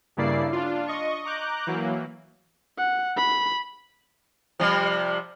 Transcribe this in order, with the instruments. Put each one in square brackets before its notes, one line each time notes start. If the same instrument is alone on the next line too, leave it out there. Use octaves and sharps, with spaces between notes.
[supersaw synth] G2 C#3 A#3 E4 D5 C7
D4 F4
D#5 C#6
A#5 D6 F#6 G6
E3 F#3 A#3
[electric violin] F#5
B5
[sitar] C3 F3 G3